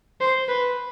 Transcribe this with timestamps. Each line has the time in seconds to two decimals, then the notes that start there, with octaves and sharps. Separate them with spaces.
0.21 C5
0.48 B4